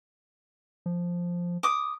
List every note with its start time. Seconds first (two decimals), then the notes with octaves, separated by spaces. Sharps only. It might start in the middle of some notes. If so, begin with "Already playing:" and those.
0.86 F3
1.63 D6 D#6